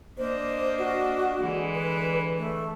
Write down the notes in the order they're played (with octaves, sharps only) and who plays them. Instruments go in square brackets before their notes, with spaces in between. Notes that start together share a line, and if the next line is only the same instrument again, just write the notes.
[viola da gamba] A#3 D4 D#5 [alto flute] C5
[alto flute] F#4
[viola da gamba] D3 E3 G#3
[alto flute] B4
A3